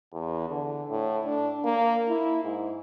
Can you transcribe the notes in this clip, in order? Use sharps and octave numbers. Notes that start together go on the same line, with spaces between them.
E2
D3
A2
D4
A#3
E4
G#2